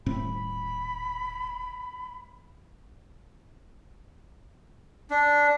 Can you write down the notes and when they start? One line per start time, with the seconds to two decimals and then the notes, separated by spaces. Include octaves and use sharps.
0.06 D#1 A2 C4 B5
5.10 D4